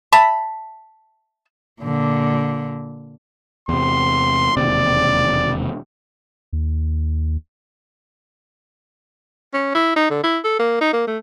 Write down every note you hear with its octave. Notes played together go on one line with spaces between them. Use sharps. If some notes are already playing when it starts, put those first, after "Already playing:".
E5 A5 B5
A#2 D3
E2 C3 C6
E1 D#2 C3 D5
D#2
C#4
E4
D#4
D3
E4
A4
A#3
D#4
A#3
A3